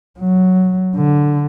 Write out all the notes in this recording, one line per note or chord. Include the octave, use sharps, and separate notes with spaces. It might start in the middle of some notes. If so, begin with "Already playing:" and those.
F#3
D3